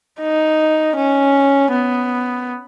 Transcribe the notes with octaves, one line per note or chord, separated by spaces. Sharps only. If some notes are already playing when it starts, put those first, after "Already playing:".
D#4
C#4
B3